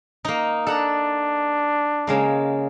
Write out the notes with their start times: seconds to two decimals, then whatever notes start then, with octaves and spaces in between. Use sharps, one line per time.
0.25 A#3 D#4
0.67 D4 A4 F#5 A#5
2.07 C#3 G#3 A#3